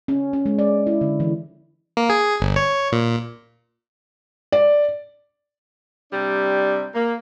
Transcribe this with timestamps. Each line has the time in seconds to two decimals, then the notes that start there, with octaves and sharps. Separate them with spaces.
0.08 C#4
0.33 C#4
0.46 G#3
0.59 D5
0.87 E4
1.01 D3
1.20 E3
1.97 A#3
2.10 G#4
2.40 G1
2.56 C#5
2.92 A#2
4.52 D5
6.11 C3 G3 D4
6.94 A#3